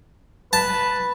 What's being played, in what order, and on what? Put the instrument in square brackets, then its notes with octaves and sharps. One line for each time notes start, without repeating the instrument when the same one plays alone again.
[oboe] B4 [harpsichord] A5